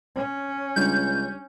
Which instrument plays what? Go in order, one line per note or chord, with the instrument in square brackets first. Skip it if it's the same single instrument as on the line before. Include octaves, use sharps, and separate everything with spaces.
[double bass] C#4
[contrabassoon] C#2 [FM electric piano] G3 D4 [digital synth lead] G6